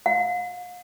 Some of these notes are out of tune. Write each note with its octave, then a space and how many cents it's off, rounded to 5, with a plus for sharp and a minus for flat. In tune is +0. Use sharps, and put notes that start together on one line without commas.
F5 +40